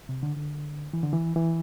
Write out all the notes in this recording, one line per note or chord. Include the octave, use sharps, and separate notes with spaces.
C3
D3
D3
E3
D3
E3
E3